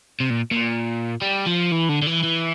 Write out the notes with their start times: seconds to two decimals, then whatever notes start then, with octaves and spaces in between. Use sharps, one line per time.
0.20 C3
0.30 A#2
0.52 A#2
1.22 G3
1.46 F3
1.72 E3
1.89 D3
2.02 D3
2.07 E3
2.23 E3